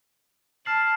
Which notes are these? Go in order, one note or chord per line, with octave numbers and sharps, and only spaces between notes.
A5 F6 C7 F#7